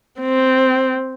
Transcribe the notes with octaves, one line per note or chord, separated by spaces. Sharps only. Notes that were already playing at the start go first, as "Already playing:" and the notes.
C4